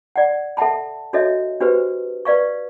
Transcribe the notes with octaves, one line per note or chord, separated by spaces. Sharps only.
D5 F#5
A4 E5 F#5 A5 B5
D4 F#4 A4 C#5 D#5 E5
D4 F#4 G4 B4 C5
B4 D5 F5 C#6